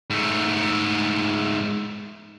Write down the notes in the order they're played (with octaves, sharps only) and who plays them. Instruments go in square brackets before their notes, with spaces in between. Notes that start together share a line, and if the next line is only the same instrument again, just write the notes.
[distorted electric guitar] G#2 A3